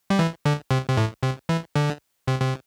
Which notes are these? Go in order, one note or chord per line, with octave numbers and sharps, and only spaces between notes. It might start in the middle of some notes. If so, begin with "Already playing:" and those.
G3
E3
D3
C3
C3
A2
C3
E3
D3
C3
C3